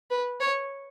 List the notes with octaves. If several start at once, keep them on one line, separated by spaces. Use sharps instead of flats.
B4
C#5